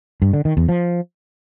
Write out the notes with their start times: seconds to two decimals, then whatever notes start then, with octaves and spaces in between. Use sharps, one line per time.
0.22 G2
0.33 D3
0.45 D#3
0.57 E2
0.69 F3